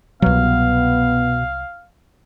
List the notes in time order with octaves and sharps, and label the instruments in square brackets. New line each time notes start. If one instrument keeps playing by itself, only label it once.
[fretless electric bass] C2 F#3 [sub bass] B2 [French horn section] B3 [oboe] F5